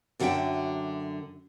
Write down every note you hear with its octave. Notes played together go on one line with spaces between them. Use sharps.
F#2 D3 F#4 A4 E5 G5